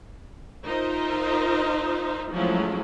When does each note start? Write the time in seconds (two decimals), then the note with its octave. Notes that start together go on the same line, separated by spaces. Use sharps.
0.65 D#4 F4 A#4 C5 D#5 E5
2.32 F3 F#3 G#3 A3 C#4 E4